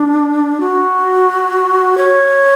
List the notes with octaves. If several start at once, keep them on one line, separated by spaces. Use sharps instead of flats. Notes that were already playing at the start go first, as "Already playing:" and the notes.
Already playing: D4
F#4
C#5